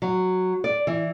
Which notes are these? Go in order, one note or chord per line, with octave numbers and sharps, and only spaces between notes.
F#3
D5
E3